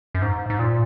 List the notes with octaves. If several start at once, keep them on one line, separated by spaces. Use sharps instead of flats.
F#2
G#2
G#2
A#2